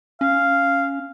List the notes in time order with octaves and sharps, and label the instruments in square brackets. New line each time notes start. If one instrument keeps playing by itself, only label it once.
[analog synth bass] C#4 [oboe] F5